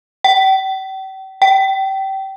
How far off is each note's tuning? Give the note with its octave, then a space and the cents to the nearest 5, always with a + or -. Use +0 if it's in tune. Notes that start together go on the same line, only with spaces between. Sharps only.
G5 -40
G5 -25